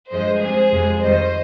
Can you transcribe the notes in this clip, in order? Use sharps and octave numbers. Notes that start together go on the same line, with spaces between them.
G2 F3 G#3 C5 D#5
C3 F3 G#3 G#4 C5
F2 C3 F3 G#3
F2 D#3 G3 C5 D#5